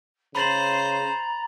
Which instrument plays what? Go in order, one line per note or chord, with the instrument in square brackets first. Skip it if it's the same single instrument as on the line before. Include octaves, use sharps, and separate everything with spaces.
[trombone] C#3 [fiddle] C5 [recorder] A#5 [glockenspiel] B5 A6 F#7